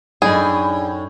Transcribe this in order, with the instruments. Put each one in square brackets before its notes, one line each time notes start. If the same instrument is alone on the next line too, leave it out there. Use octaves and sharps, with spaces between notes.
[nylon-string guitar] F#2 D#4 G#5 [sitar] A2 [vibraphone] D4 D5 B5 [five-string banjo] G#4